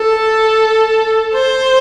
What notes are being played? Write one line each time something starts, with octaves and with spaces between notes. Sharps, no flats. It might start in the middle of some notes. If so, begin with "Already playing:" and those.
Already playing: A4
C5